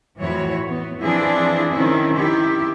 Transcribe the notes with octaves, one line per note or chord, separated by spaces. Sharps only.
F2 A2 E3 E4 F#4 C#5
B3
E3 F3 C4 D4 E4 G#4
D#3 C4 C#4 E4
D#3 E4 G4